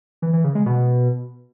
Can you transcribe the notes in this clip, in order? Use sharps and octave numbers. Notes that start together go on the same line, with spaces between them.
E3
E3
C#3
G#3
B2